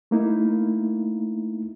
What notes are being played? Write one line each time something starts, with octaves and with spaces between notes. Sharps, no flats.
A3 A#3 D#4 E4